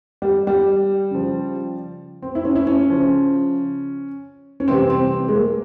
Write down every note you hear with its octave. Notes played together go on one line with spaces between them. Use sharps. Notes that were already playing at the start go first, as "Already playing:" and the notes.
G3
G3
C#3 F3
C4
E4
C#4
E4
C#4
C#3 F3
C#4
C3 E3 G3 C4
C4
G#3
A#3